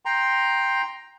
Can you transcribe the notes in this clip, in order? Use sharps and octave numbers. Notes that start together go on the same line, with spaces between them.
G5 A#5 C6